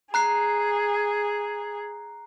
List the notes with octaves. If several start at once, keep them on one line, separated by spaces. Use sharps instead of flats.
G#4 A#5 F#6 C7